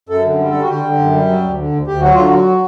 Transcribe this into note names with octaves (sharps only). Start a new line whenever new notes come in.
F#2 A4
D3
G3
G3 A4
F#4
D3 G4
D3
F#2
G3
F#3
D2
D3
D2
D2 G4
F#3 F#4
D3 F4
F#3 F#4